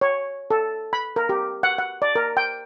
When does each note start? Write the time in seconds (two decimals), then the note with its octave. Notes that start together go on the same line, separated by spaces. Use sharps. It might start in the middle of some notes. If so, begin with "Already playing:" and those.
0.01 C#5
0.51 A4
0.93 B5
1.16 A#4
1.29 G4
1.63 F#5
1.78 F#5
2.02 D5
2.15 A#4
2.37 G5